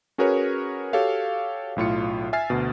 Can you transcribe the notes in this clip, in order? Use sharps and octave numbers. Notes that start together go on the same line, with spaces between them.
C#4 F#4 G#4 A#4 B4 C#5
F#4 G4 A4 C#5 F5
B1 A2 F4 C#7
E5 G#5 F6 A6 C7
D2 B2